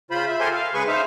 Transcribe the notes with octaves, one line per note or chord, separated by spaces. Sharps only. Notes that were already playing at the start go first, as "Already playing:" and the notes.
C#3 F4 C5 B5
E5
G4 A4 A#4 C5 G#5 C6
F5
C#3 G#3 G#4 B4 G#5 C#6
D#4 C5 E5 F5